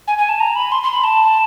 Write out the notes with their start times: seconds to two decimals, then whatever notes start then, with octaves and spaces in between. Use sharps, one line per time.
0.08 G#5
0.18 G#5
0.29 A5
0.40 A#5
0.56 B5
0.72 C6
0.83 C6
0.93 B5
1.04 A5